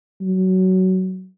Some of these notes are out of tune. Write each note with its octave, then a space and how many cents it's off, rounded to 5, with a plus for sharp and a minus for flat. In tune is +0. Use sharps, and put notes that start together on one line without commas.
F#3 +15